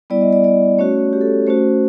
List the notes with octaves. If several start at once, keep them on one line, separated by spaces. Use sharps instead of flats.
G3 B3 E4 D5
D#5
D5
D5
A3 C#4 F#4 C#5
G4
A4
A3 C#4 F#4 C5